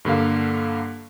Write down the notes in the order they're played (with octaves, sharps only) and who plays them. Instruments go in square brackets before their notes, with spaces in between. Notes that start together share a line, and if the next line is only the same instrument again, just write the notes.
[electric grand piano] G2 D3 A#3 F5